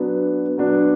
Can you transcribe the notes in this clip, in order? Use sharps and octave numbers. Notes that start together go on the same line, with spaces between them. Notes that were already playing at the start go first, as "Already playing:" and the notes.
Already playing: F#3 B3 D4
F#3 B3 D4